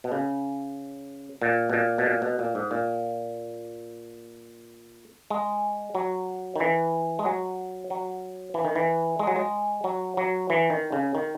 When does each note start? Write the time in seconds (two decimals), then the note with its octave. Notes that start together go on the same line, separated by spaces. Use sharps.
0.04 B2
0.12 C#3
1.42 A#2
1.70 B2
1.73 A#2
1.98 B2
2.06 A#2
2.22 B2
2.39 A#2
2.55 G#2
2.71 A#2
5.30 G#3
5.95 F#3
6.56 D#3
6.60 E3
7.19 G#3
7.25 F#3
7.90 F#3
8.54 E3
8.65 D#3
8.76 E3
9.19 G#3
9.27 F#3
9.36 G#3
9.84 F#3
10.17 F#3
10.50 E3
10.70 D#3
10.92 C#3
11.15 D#3